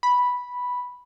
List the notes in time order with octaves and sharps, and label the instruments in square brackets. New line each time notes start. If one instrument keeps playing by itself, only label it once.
[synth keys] B5